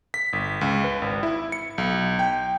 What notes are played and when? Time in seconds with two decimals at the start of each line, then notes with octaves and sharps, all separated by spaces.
0.14 B6
0.33 G1
0.61 C#2
0.84 B4
1.02 G#1
1.23 E4
1.52 C#7
1.78 B1
2.19 G5